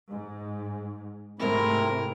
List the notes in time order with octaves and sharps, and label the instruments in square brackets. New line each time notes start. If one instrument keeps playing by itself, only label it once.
[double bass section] G#2
[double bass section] G#2 C3 A3 [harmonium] C4 E4 [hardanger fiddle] A#4